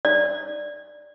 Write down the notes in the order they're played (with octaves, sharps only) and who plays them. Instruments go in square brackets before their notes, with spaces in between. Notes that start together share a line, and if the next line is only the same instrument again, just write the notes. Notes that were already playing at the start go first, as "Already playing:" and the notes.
[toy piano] D5